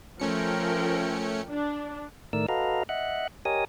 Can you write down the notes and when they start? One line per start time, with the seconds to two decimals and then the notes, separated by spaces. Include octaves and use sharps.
0.20 F3 A3 C#4 A#4 G5 C#7
1.49 D4
2.33 A2 D#3 A3 A#4 D5 E6
2.49 F#4 A4 B4 D#5 F5 A#5
2.89 D#5 E5 F#5 F#6
3.45 G4 A#4 C#5 D#5 G#5 D#6